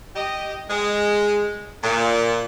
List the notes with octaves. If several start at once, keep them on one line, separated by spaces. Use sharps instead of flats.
G4 D#5
G#3
A#2